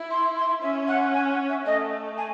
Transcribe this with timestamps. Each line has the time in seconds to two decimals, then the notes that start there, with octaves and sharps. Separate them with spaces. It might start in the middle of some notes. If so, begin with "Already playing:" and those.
Already playing: E4
0.11 C6
0.36 C6
0.62 C#4 E5
0.88 F#5
1.14 G#5
1.32 F#5
1.49 E5
1.66 A3 D#5
2.18 G#5